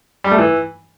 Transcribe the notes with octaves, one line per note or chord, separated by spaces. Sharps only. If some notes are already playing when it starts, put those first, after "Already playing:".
G3
A3
E3